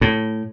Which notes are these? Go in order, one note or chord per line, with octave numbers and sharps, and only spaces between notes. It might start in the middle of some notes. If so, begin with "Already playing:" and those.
A2